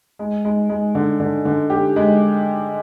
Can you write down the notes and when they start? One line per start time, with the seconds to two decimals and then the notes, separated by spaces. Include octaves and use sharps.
0.19 G#3
0.45 G#3
0.69 G#3
0.95 D3
1.20 D3
1.45 D3
1.70 G4
1.96 G#3